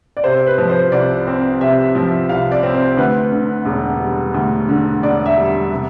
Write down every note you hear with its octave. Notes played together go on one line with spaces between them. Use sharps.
D5
C3 C5
B4
F3
C5
C2 D5
C4
C3 E5
F3
C2 F5
D5
C4
C5
D2 B4
D3
E1
G3
D2
D3
E1 D5
E5
G3
C3